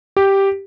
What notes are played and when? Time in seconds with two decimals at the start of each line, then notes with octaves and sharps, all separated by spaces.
0.17 G4